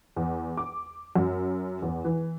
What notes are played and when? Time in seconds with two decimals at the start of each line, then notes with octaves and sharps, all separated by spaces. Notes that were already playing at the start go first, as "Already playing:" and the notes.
0.16 E2
0.57 D6
1.15 F#2
1.82 E2
2.05 E3